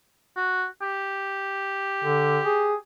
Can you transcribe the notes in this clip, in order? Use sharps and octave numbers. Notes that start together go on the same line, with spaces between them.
F#4
G4
D3
G#4